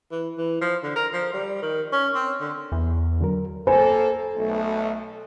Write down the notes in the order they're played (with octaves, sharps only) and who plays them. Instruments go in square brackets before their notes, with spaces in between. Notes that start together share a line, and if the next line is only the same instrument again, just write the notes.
[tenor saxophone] E3
E3
F3
D3
A#4
F3
G3
D#3
C#4
C4
D3
[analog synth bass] E2
[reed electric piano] D3 F#3 A#4
[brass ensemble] A#3 A4 [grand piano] C5 G#5
[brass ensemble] B1 A3